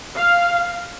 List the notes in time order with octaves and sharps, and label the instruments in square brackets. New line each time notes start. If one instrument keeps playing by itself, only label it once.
[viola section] F5